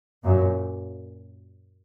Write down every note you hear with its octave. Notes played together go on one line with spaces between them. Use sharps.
F#2 A#2